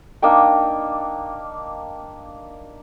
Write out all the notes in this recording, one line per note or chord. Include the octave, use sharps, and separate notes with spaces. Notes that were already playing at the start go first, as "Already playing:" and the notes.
A#3 D4 D#4 G5